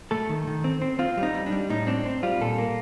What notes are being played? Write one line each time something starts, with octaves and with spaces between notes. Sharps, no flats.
A3 A4
D#3
D#3
C4
C4
C4 F4
G3
D#4
G3
D4
G3
A2 D#4
C4 D4
C4
G3 F4
A#2 A4
A#3